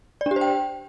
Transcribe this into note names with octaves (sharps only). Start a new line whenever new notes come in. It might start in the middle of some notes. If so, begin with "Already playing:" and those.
D5
D4
G4
C5
G5